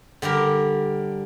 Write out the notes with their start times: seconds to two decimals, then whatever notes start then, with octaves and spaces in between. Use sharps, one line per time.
0.22 D3 G3 G4 A#4